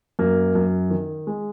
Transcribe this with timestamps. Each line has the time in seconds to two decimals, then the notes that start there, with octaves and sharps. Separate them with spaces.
0.19 F#2 A#3
0.55 F#2
0.90 D#3
1.27 G#3